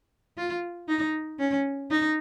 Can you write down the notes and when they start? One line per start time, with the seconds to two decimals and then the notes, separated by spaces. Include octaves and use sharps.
0.37 F4
0.88 D#4
1.39 C#4
1.90 D#4